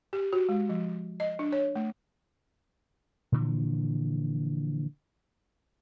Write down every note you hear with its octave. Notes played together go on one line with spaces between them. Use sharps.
G4
F#4
G#3
F3
D#5
D4
C#5
A3
A#2 D3 E3 F3